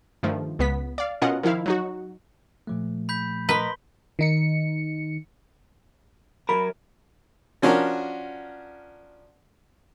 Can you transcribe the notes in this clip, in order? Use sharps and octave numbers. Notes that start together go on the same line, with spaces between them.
G2 D#3 F3 A3
C#2 B3 B6
D5 F5
B2 C#4 F4 A#4 D#5 F#5
D#3 F3 E4 F5
F#3 D#4 F#4
A#2 F3 A3
B5 G6 B6
A#4 B4 D#5 C6 B6 G7
D#3 D#4 C#7
F#3 A#4 B5
F3 C#4 D4 F#4 A#4